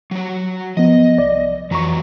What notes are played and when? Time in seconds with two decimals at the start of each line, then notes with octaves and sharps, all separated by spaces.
0.11 F#3 C#5
0.77 F3 B3 D#5
1.18 C2 D5
1.71 F2 E3 F#3 A#5 C#6